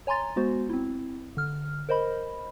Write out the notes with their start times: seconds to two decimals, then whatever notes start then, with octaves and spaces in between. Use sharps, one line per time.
0.07 C#5 G#5 A#5 C6 A6
0.36 G#3 B3 F#4 C5
0.70 C4 E4
1.37 D3 F6
1.89 A#4 C5 D#5 B5